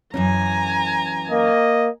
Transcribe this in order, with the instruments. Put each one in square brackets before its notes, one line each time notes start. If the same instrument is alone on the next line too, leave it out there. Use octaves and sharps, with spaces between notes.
[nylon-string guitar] F#2 E3 C#4 [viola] G#5 A#5
[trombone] A#3 [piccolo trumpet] D#5